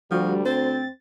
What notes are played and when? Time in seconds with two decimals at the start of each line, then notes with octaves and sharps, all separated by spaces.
0.11 D2 F3 G3 F#4
0.46 C4 C5 A6